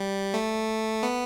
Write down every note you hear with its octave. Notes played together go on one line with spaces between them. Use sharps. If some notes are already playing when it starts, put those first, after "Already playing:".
Already playing: G3
A3
B3